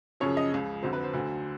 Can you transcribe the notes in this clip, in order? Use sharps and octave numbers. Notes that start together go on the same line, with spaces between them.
F#2 C#3 F3 C#5
D#5
C#2 C#3 F3
F2 D3 F#3 C5
B4
C5
D2 D3 F#3